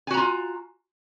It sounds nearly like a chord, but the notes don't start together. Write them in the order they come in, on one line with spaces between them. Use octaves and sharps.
G#5 F#4 A#5 F4